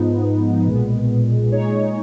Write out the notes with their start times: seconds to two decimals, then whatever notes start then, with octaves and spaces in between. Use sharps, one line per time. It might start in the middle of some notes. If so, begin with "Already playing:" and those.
Already playing: G#2 F3 B3 D#4
0.67 B1 A#2 G#3 B3
1.50 A#2 G#3 D#4 G#4 C#5